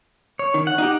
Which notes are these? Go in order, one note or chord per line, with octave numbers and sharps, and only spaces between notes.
C#5
D#3
F#5
D#4 F#4 G4